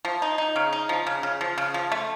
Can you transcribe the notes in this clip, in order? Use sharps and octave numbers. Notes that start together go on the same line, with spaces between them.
F3
D#4
D#4
C#3
D#4
F3
C#3
C#3
F3
C#3
F3
A3